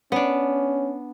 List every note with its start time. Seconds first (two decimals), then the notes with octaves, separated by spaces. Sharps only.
0.12 B3 C#4 D4